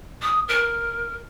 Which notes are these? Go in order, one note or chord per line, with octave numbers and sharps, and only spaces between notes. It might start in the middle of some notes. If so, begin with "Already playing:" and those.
D#6
A#4